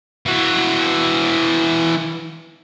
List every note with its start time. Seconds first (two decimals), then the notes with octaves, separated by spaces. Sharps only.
0.26 E3 F#4